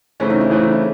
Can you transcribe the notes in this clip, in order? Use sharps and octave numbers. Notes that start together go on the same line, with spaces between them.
C#3 E3 A3 C4 C#4
D#4
E4
C#3 E3 A3 C4
D#4
E4